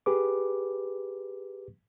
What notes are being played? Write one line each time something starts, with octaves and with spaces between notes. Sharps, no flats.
G4 G#4 B4 D6